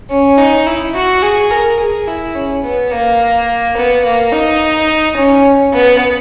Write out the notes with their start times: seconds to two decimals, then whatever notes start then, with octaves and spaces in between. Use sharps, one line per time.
0.10 C#4
0.38 D#4
0.67 E4
0.95 F#4
1.22 G#4
1.51 A#4
1.80 G#4
2.07 E4
2.35 C#4
2.64 B3
2.92 A#3
3.77 B3
4.05 A#3
4.33 D#4
5.17 C#4
5.73 B3